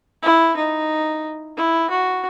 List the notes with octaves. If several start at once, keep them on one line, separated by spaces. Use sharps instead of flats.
E4
D#4
E4
F#4